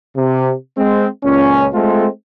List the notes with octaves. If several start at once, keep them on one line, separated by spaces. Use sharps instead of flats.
C3
G#3 C4
C#2 A#2 C#4
G#3 A3 C4 F4 A4